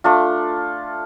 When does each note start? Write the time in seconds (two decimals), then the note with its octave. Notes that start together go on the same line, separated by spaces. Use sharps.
0.04 A3 D4 F4